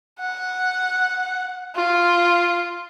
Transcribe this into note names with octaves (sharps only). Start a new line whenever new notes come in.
F#5
F4